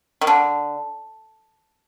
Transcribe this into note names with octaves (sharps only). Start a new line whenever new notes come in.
D#3
D3